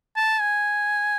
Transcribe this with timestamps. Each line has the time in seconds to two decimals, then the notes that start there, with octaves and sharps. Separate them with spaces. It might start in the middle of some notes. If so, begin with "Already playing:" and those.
0.16 A5
0.41 G#5